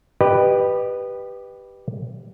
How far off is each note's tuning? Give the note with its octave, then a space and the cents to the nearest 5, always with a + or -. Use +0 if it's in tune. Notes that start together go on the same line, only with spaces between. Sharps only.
G4 +0 B4 +0 D#5 -35